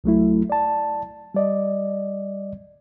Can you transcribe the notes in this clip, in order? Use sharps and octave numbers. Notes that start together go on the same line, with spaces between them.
C2 F#3 A3 E4
D5 A5
G3 D5 D#5